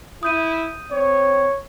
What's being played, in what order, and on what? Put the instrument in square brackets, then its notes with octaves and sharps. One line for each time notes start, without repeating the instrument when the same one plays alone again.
[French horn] E4 [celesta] D#6 G6 D#7
[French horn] C4 [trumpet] C#5